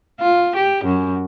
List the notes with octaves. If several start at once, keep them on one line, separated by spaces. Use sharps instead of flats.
F4
G4
F#2